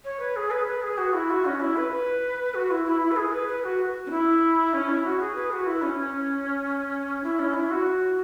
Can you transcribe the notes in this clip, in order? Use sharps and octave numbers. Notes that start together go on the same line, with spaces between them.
C#5
B4
G#4
B4
B4
G#4
F#4
E4
F#4
C#4
E4
B4
B4
F#4
E4
E4
E4
B4
G#4
B4
B4
F#4
C#4
E4
C#4
E4
F#4
G#4
B4
F#4
E4
C#4
C#4
E4
C#4
E4
F#4